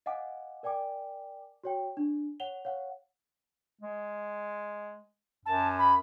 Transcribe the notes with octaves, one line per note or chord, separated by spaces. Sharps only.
D#5 F5 F#5 G#5 D6
A#4 D5 G5 G#5 D6
F#4 C#5 G5
D4
C#5 F#5 F7 G7
C#5 F5 F#5
G#3
F#2 A5
B5